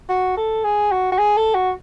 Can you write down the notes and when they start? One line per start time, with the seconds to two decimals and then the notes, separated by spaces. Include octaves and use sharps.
0.09 F#4
0.37 A4
0.64 G#4
0.91 F#4
1.12 F#4
1.18 G#4
1.37 A4
1.55 F#4